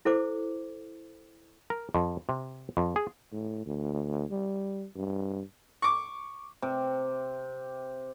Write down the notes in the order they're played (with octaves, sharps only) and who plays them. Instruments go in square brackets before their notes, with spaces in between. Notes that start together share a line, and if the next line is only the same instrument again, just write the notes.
[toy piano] E4 A4 C5 D6
[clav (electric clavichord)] A#4
F2
C3
F2
G#4
[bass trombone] A2
D2
G3
G2
[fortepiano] C#6 D6
[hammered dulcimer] C3